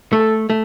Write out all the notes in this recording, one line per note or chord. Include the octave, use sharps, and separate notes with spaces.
A3 A4
A3